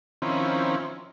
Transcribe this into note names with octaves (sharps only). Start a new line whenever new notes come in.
D#3 F3 C4 C#4 E4